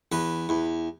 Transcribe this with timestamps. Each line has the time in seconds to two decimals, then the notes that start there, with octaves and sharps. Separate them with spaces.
0.12 E2 B4
0.49 E2